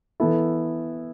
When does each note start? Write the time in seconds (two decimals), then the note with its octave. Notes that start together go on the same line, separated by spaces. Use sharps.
0.20 E3 B3 E4 A4